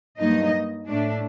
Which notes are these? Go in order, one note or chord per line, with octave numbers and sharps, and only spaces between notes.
G2 F#3 A#3 D#4 D#5
A2 A3 D4